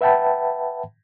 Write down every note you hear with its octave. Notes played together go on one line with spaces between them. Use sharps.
B4 E5 F#5 G5 A5 B5